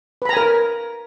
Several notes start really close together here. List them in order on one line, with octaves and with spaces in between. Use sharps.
B4 B5 A#5 G#5 A#4